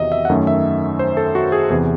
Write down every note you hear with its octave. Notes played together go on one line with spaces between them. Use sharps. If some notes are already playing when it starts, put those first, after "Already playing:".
Already playing: E2 C3 D#3 F#3 D#5 E5
E5
F#5
F#2 D#3 A3 C#4 E5
E5
C5
A4
F#4
G#4
E2 C3 E3 G#4